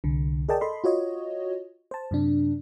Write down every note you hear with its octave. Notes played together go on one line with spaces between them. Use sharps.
C2 D3
G#4 A#4 D5 D#5 G5 A5
A4 D#5 B5 C6
F4 F#4 C#5 D#5
C5 A5
F#2 C3 D4